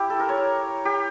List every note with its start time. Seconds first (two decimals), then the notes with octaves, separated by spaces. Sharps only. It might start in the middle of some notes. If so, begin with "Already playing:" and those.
Already playing: E4 G4
0.10 A4
0.20 A#4
0.29 C#5
0.38 A#4
0.85 G4